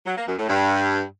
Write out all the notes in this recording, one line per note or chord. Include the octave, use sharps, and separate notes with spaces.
F#3
A#3
F#2
A2
G2